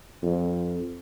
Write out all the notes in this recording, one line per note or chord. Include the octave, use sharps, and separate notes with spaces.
F2